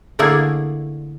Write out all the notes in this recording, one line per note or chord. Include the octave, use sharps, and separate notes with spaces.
D3 A3 A#3 E4 G#4 D5